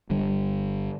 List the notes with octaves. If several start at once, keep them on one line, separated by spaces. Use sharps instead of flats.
G1 D3 G3